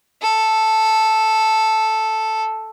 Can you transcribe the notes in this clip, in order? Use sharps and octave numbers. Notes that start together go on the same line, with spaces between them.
A4